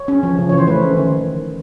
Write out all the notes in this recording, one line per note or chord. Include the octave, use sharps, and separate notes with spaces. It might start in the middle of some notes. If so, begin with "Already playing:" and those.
Already playing: C#5
C#4
F3
C#3
E3 C#5
C5
A3 B4
C#4
D#3